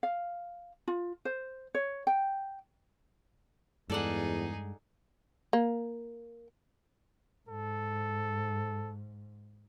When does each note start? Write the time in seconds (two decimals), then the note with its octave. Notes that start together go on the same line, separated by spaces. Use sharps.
0.03 F5
0.88 F4
1.25 C5
1.75 C#5
2.07 G5
3.90 E2 G2 G#3 D#4 G#4 A4 D5 F#5
5.53 A#3
7.49 G#2 A4